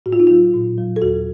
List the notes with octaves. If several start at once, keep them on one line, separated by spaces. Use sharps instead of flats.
A2 F#4
F4
D#4
F#3 F4
A#2
F#3
A4
D#2 F#4